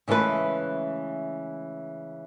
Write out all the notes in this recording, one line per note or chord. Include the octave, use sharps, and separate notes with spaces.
C#3 E3 G#3 A3 B4